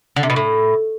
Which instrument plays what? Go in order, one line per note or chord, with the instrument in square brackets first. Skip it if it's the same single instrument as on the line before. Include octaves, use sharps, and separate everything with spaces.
[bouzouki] D3
C3
B2
A2